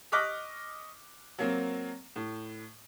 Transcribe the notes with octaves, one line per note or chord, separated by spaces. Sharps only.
D#5 C#6 D6 F6 F#6 B6
F#3 A#3 C4
A2